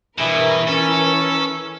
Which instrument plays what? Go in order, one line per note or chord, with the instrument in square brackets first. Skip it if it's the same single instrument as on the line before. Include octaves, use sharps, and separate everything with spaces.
[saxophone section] G2 G#4 E5 [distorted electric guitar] B2 [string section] E3 A#4 B4
[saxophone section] C#4 [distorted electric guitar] A4